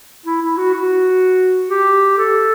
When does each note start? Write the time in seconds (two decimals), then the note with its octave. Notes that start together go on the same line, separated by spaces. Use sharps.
0.26 E4
0.42 E4
0.58 F#4
0.74 F#4
1.70 G4
2.18 A4